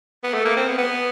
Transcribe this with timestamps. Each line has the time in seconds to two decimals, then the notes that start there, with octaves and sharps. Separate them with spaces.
0.24 B3
0.34 A3
0.45 A#3
0.56 C4
0.67 B3
0.78 B3